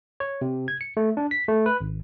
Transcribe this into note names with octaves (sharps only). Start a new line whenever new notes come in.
C#5
C3
G#6
C#7
A3
D4
B6
A3
B4
G#1